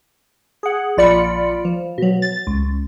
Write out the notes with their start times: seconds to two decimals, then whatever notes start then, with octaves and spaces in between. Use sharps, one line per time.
0.63 G#4 F#5
0.97 A#1 F4 D5 B5 C#7
1.65 F3
1.98 B2 F#3
2.22 A6
2.47 C#2